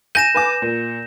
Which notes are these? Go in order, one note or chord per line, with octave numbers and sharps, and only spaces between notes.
G#5 G6 A#6 D#7 E7
B4 G#5 D6
A#2